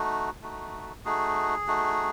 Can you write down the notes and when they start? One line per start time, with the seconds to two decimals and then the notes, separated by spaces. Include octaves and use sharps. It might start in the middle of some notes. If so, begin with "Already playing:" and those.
Already playing: A3 D#4 F#4
0.42 A3 D#4 F#4
1.05 A3 D#4 F#4 G#4
1.67 A3 D#4 F#4